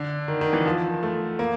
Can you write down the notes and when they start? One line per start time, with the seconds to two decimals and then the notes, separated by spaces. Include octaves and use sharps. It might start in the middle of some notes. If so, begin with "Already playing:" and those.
Already playing: D3
0.28 D#3
0.41 D#3
0.53 E3
0.66 F3
1.03 A3
1.39 A#3